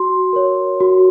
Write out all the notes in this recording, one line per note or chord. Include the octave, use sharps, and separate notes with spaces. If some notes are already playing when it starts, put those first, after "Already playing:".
Already playing: F#4 C6
A#4 C#5
F#4